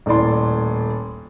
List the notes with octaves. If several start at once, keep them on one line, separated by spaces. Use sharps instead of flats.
D#1 A2 D5 C6